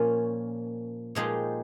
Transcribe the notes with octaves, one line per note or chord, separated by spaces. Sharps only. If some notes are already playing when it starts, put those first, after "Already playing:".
Already playing: A#2 F3 A#3 C#4
A#2 F3 G#3 D#4 G4